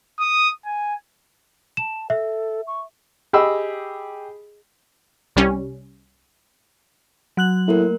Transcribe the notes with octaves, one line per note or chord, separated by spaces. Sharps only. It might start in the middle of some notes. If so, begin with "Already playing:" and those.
D#6
G#5
A5 E7
A4 E5
C#6
G4 G#4 D#5 B5 E6
C2 G3 C#4
F#3 F#6 F#7
A2 A3 A#3 A#4